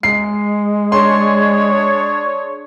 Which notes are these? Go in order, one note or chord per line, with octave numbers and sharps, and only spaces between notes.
G#3 C7
D4 G#4 C#5 C6